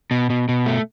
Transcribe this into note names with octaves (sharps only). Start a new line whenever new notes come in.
B2
B2
B2
A3